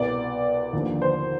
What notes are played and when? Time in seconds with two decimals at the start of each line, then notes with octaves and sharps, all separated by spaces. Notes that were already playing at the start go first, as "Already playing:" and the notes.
Already playing: C2 B2 B3 D5
0.73 D#2 D3 F3
1.02 C5